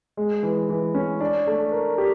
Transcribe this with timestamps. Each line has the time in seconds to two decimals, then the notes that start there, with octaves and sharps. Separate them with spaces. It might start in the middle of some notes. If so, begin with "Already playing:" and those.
0.17 G#3
0.43 E3
0.69 E3
0.95 C#4
1.20 D4
1.47 A3
1.72 A#4
1.98 G4